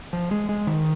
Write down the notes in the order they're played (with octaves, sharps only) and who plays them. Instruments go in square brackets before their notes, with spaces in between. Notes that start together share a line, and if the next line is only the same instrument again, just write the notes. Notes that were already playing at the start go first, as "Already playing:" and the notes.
[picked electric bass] F3
G#3
G#3
D#3